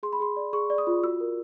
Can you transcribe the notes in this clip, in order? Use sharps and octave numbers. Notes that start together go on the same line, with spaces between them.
G#4 C6
B5
G#4 C6
D5
G#4 C#6
D5
D#6
F4
F#4 E6
A#4